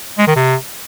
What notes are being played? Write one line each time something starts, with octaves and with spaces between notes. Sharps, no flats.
G#3
D#3
C3